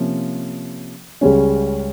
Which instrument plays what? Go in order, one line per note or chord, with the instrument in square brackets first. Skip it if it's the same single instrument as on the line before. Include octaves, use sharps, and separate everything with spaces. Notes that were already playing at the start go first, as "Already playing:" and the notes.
Already playing: [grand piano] C3 F3 A#3 C#4
C#2 C#3 G3 C#4